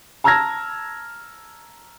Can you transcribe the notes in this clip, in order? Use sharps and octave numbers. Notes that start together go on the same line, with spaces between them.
A5 A#5 E6 F6 G#6 A#6